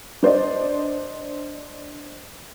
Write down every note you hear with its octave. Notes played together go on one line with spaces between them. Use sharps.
D4 C5 D5 D#5